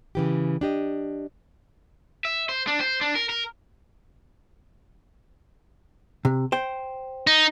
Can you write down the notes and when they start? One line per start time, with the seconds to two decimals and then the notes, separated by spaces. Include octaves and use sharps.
0.15 C#3 E3 G4
0.61 D4 G4 D#5
2.25 E5
2.49 C5
2.67 D4
2.80 C5
3.01 D4
3.15 A#4
3.30 A#4
6.25 C3
6.52 C5 G5
7.27 D#4